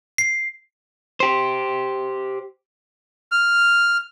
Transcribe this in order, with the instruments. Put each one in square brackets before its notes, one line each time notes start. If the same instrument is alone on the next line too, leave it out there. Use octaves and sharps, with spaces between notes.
[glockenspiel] C7
[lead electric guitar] G4 C5
[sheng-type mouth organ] F6